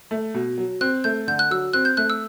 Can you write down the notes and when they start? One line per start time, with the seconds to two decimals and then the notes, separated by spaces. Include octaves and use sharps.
0.11 A3
0.34 B2
0.58 F#3
0.81 C4 F#6
1.04 A3 G6
1.27 D3 G6
1.39 F#6
1.51 F#3 E6
1.73 C4 F#6
1.85 G6
1.97 A3 F#6
2.10 E6